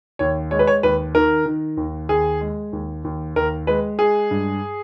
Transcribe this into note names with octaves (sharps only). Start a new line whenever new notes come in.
D#2 C#5
G#3 C#5
B4
C#5
D#2 B4
D#3 A#4
D#3
D#2
D#2 G#4
G#3
D#2
D#2
D#2 A#4
G#3 B4
G#3 G#4
G2